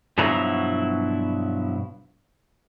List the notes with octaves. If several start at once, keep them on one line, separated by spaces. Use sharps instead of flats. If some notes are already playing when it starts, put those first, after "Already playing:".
G2 B2 F3 F#3 E4 A#5